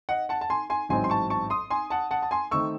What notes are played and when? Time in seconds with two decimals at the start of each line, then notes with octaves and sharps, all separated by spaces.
0.09 D#5 F#5
0.29 F#5 A5
0.41 A5
0.50 G#5 C6
0.70 G#5 C6
0.89 A1 G#2 F#3 C4 D#4 G#5 C6
1.04 C6
1.10 A5 C#6
1.30 A5 C#6
1.50 C6 D#6
1.70 G#5 C6
1.90 F#5 A5
2.11 F#5 A5
2.22 A5
2.31 G#5 C6
2.51 D#3 A3 C4 D#4 C#6 E6